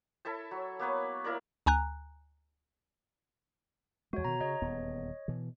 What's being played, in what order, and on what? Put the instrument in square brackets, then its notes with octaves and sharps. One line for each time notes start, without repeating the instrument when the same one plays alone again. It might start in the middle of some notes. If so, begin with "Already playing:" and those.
[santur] E4 A4 E5 A5
F#3
A#3 B3 B4 C#5
A#3 E4 A#4 D5
[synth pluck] D2 G#5 A#5 F#6
[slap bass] E2 G#3 [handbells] F#4 C#5
[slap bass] B2 D#3 [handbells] A#5
[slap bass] C#3 [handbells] C#5 D#5
[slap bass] D#1 E2 B3
B2 E3